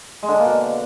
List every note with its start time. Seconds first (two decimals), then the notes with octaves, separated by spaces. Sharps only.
0.23 G#3
0.28 D3
0.34 D4
0.40 A#3
0.45 B2